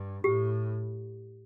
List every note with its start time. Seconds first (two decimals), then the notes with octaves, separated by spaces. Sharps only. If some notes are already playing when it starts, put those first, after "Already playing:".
Already playing: G2
0.24 A2 G4